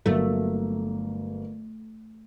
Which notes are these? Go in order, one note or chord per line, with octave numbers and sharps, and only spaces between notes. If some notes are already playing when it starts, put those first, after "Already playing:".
G1 F#3 A3 A#3